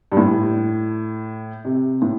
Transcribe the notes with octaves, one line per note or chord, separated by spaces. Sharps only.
G2
A2
C3
A2